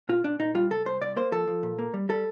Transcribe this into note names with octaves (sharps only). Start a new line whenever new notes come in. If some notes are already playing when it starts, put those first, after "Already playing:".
A#2 F4
A#2 D4
A#2 D#4
G3 F4
C2 A4
C2 C5
C2 D5
A#3 C5
F3 A4
F3
A#2
A#3
G3
G3 A4